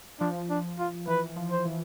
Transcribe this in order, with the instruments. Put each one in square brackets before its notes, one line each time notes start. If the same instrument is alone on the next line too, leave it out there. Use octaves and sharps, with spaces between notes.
[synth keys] F3 [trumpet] D4
[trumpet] D4
F4
[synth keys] E3 [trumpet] B4
[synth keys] F3
[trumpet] C5
[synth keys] E3